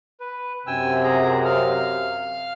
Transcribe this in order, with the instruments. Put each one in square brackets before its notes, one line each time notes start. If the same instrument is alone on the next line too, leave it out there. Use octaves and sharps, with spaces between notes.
[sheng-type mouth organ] B4
[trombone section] F#2 C3 [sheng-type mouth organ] G5 G#5 E6
[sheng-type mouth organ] G#4 A#5
F5 F6